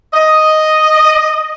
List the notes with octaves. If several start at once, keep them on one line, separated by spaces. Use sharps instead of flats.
D#5